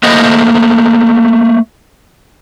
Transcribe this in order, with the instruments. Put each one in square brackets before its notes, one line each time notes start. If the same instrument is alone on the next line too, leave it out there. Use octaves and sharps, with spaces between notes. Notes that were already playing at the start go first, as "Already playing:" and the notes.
[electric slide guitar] A3 A#3 C5 D#5